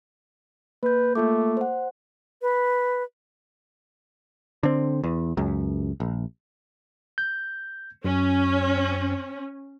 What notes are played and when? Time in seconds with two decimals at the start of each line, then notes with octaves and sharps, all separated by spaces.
0.83 A#3 B4 G6
1.15 A3 A#3 F4 D6
1.57 C5 F#5
2.42 B4
4.63 D3 C4
5.04 E2
5.37 C#2 F#2
6.00 A#1
7.18 G6
8.05 F#2 C#4